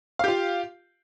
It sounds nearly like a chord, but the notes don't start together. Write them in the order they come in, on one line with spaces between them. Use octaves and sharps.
F5 G4 F4